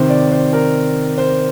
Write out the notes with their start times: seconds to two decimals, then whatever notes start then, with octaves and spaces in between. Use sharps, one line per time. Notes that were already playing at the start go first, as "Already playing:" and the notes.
Already playing: C3 D#3 C5
0.09 D5
0.32 C5
0.53 A#4
1.18 C5